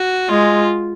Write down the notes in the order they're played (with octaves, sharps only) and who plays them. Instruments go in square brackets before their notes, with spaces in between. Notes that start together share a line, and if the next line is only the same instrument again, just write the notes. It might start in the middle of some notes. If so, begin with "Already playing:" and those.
Already playing: [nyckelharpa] F#4
[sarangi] G#3 [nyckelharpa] F4